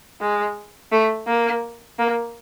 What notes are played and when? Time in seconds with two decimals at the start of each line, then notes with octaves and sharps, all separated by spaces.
0.21 G#3
0.92 A3
1.27 A#3
1.99 A#3